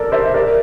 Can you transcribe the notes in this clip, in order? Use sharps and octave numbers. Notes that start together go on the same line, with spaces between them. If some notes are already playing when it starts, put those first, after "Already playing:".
Already playing: A4 A#4 D5
C5 E5
A#4 D5